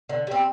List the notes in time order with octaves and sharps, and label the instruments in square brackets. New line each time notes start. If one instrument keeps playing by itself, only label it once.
[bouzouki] D3
G3 C4